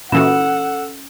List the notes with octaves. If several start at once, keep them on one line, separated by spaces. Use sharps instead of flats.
A#2 E3 C#4 F#4 A4 F#5 E6 E7